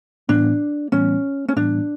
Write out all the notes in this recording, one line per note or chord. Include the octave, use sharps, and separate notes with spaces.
A2 E3 G3 B3 D4
A2 E3 G3 B3 C#4
C#4
A2 E3 G3 B3 D4